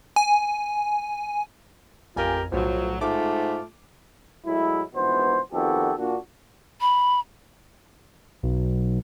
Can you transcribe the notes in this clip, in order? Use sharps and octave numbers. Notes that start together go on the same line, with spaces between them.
G#5
A1 F2 F4 G4 A#4 G#5
B1 A2 F3 F#3
G#2 A3 F4 D6
A2 F#3 G#3 E4
A#1 G#2 B2 E3 B3 C5
F2 D#3 B3 F#4 G4 A4
A#2 D4 F#4
B5
B1